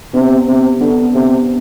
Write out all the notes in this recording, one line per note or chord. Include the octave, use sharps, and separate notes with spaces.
C3 B3 D4
C3
D3 B3 D4
C3